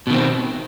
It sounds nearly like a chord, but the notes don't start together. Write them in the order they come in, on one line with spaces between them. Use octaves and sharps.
B2 D#3 C4